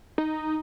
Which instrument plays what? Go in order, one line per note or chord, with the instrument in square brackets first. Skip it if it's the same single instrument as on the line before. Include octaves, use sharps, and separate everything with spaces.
[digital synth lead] D#4